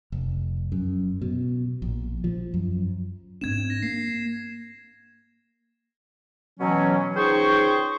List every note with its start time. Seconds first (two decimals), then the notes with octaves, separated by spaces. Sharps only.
0.12 F1
0.72 F#2
1.21 B2
1.82 A#1
2.24 F3
2.54 F#2
3.41 G#2 C4 D4 G#6 E7
3.70 A#6
3.82 A#3 C7
6.59 B2 E3 F#3 C#4
7.16 C#2 D#4 G#4 C5 G5 C#6